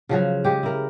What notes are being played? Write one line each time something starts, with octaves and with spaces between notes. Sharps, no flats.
C#3 F3 F#3
G#3 G4
E4 A#4